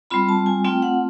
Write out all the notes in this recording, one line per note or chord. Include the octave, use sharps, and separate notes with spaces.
G3 C4 F4 B5
A5
G#5
A3 C4 F4 G5
F#5